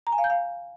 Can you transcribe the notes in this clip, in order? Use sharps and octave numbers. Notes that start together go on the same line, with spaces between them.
A#5
G#5
F5
G6
F5